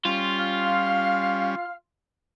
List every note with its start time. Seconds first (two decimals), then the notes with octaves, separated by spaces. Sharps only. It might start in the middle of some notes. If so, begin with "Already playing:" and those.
0.05 G3 C#4 F4
0.38 F5 F6